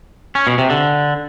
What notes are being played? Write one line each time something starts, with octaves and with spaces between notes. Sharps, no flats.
C#4
B2
C3
D3